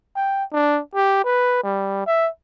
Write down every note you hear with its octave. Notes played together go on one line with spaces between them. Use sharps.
G5
D4
G4
B4
G3
E5